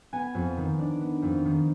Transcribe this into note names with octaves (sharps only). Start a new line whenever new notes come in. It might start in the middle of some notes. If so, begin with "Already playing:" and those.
B3 G#5
F2
D#3
D4
B3
F2
D#3